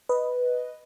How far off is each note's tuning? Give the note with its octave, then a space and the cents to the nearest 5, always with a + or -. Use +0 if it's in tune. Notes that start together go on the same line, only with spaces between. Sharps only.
B4 +0 D#5 +0